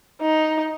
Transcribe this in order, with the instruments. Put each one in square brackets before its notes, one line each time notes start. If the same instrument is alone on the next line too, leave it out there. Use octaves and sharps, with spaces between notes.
[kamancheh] D#4